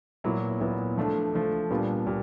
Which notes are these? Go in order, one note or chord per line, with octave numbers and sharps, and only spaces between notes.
A#2 F#3 B3 E4
A#2 F#3 B3 E4
F3 A3 D4
F3 A3 D4
A#2 G3 B3 D4 F4
A#2 G3